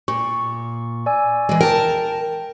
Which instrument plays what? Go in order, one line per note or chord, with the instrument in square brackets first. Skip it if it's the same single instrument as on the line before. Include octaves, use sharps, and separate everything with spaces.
[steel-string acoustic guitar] A#2 [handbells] C#6
[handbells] D5 G#5 E6
[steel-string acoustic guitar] E3 G#3
[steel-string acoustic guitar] A#4 A5 [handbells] G5